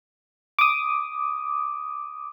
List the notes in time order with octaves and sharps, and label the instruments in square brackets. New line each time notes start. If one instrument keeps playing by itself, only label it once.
[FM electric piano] D6 D#6